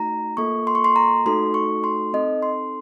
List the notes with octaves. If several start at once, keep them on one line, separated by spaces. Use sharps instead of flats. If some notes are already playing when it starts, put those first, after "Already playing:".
Already playing: A3 D#4 F#4 A#5
A#3 F4 A4 C#6
C6
C#6
C6
A#5
A3 D#4 F#4 A4 C6
C#6
C6
C4 D#4 A4 D#5
C6